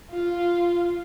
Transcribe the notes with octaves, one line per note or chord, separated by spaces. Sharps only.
F4